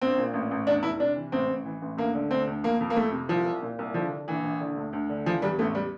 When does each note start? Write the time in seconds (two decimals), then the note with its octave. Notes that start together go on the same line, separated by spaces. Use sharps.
0.02 A#1 C4
0.18 A#2
0.34 A1
0.51 A1
0.67 E2 D4
0.83 F1 E4
1.00 C3 D4
1.16 E3
1.32 A1 C4
1.49 A1
1.65 E3
1.82 A1
1.97 D2 A#3
2.14 D3
2.31 D2 C4
2.47 D2
2.63 F2 A#3
2.81 F2
2.90 A#3
2.96 F2 A3
3.12 C3
3.29 C2 F3
3.45 C2
3.62 A#2
3.79 C2
3.94 D3 F3
4.11 D3
4.28 A#1 E3
4.44 A#1
4.61 D3
4.77 D2
4.93 D2
5.10 D3
5.26 E3 F3
5.42 E2 G3
5.59 A1 A3
5.75 G3